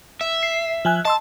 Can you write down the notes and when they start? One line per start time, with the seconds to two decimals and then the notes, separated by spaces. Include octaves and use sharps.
0.21 E5
0.43 C7
0.85 F3 G#5 F#6
1.05 D#5 A5 C6 E6